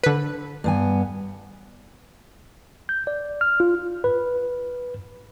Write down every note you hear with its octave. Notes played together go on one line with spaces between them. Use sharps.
D3 B4
G2 B3 G#5
G6
D5
F6
F4
B4